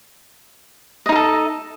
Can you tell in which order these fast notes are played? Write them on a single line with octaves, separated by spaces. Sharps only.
D#5 D#4 A#4 A4